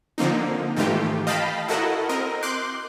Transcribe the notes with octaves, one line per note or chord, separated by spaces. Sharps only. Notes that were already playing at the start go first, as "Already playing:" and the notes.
D3 F3 A#3 C4 D#4
G#2 D#3 E3 A3 F4 G4
D#5 F5 G5 A5 B5
E4 F#4 A4 A#4 D#5 F#5
C4 A#4 D#5
C6 D6 F#6 G6